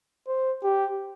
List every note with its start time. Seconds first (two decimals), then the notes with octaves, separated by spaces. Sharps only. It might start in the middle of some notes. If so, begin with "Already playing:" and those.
0.27 C5
0.63 G4